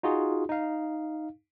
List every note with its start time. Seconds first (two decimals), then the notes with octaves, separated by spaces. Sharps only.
0.03 D#4 F4 F#4 G#4
0.49 D#4 F5